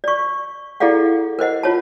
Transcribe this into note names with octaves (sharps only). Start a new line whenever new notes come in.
D5 C#6
E4 G#4 A4 D5 F5 F#5
A#4 C5 D#5 F#5
F4 C#5 A5